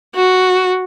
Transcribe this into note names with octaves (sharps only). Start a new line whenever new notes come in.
F#4